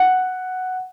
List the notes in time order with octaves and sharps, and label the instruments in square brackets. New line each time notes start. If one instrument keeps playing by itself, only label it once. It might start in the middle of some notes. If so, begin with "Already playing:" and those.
Already playing: [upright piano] F#5